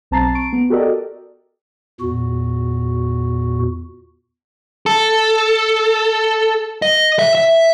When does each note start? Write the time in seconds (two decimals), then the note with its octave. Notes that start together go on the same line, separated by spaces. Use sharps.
0.11 B1 C4 A5 A#5 A6 C7
0.35 C#6 D7
0.53 B3
0.70 F#4 G4 A4 A#4 D5 D#5
2.01 E2 A#2 F#4
4.86 A4
6.82 D#5
7.19 E5
7.35 E5